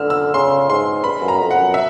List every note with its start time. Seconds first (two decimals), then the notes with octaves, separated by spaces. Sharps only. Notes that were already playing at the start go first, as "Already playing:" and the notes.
Already playing: D3 E6 F6
0.10 E6
0.34 C#3 C6
0.69 G#2 C6
1.04 G2 B5
1.22 F#2
1.28 A#5
1.40 F2
1.51 F#5
1.57 F#2
1.74 E5